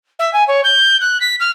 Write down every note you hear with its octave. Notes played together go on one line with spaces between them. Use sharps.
E5
G#5
C#5
G6
F#6
B6
F6